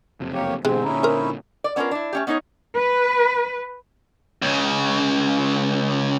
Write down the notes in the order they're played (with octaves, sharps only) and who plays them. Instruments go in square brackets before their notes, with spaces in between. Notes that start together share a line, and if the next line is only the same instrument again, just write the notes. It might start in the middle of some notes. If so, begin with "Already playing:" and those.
[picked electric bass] F#1 F2 C3
[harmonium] A#3 G4 C#5
[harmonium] G#2 C4 [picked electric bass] B2 D3 E3 [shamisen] G#3 G4
[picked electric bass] A#2 D3 [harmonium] C#4 D#4 E4
[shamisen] A#4 C5
[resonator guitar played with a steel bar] D5
B3 C#4 D4 E4 F4 A#4
D4 E4
A3 C#4 G4
B3 C#4 D#4 C#5 D#5
[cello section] B4
[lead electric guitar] C#2 C#3